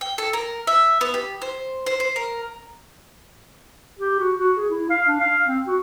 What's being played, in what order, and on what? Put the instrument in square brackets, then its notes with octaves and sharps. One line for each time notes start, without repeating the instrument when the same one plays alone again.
[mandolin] G5
A4
A#4
E5
B3
G4
C5
C5
C5
A#4
[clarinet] G4
F#4
F#4
G#4
E4
F5
D4
F5
C4
F#4